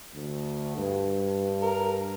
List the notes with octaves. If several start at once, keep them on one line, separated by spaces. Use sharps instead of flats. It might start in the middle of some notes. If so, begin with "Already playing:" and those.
D2
G2
A#4